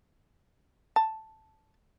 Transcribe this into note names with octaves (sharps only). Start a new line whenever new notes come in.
A5